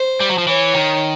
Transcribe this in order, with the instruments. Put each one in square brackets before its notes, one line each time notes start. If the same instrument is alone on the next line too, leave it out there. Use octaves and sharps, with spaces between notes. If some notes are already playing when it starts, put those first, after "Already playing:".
Already playing: [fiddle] C5
[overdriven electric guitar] G3
F#3
F3
[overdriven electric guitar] E3 [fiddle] C#5
[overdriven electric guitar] D#3